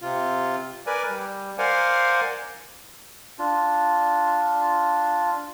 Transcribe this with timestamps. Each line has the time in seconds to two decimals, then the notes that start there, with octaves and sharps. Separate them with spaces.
0.02 C3 F4
0.87 A#4 B4 D5 G#5
1.09 G3
1.58 A#4 C5 D5 F5 F#5 G#5
3.39 D4 F4